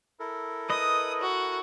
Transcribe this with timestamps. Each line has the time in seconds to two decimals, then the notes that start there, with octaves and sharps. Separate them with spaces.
0.20 E4 A4 A#4
0.70 B4 D#5 D#6
1.21 F#4